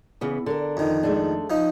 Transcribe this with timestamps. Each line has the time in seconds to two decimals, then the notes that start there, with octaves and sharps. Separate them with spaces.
0.21 C#3 E3 B3
0.46 D3 D4 A#4
0.77 F2 D#3
1.03 G#3 A3 D4
1.50 F3 D#4